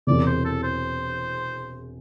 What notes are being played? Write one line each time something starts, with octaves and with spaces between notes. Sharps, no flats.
E1 E2 C3 D5
C5
A4
C5